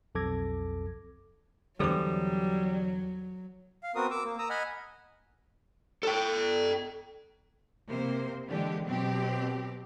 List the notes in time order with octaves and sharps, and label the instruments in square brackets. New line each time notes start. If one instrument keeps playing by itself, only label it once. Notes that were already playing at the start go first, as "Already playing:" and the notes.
[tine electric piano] B1 F2 A4 D6 G#6 A#6
[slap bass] E2 D3 [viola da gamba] F#3 [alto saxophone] G3 [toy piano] A4 C5 D6
[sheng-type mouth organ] F5
B3 C4 F#4 A#4 D#6
D6 E6
A#3
A#5 D#6 E6
D#5 F#5 G#5 B5 F6
[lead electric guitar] A4 G5
[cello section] C3 A#3 C5
D3 E3 G#3 G4
B2 F#3 C4 G4